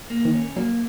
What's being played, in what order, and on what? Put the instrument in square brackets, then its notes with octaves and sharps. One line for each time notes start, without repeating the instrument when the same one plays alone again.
[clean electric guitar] A#3
[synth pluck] D#3
[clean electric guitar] C#4
[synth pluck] F#3 [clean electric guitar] A#3